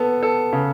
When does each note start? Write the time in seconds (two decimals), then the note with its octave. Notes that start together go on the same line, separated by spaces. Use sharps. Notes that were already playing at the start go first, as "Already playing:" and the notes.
Already playing: B3 A4
0.23 A4
0.53 C#3